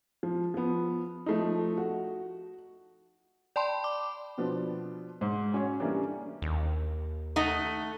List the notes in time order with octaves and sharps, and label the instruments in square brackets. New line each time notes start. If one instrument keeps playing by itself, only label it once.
[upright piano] F3
F3 B3
F3 A3 D#4
F#4
[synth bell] D5 G5 A5 B5 C6
D6
[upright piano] B2 F3 B3 D4
G#2
C#4 F#4 C#5
E3 G3 A3 A#3 C#4 D4
[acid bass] D#2
[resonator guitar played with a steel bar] A3 D#4 F#5